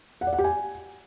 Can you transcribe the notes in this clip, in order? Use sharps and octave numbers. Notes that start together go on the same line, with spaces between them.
F#5
D5
F#5
G4
G#5